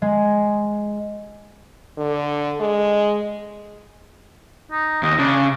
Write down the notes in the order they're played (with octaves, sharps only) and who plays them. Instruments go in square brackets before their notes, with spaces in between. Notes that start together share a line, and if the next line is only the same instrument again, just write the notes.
[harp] G#3
[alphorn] D3
G#3
[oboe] D#4
[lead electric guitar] D#2 [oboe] D#5
[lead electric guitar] C#3 [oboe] D4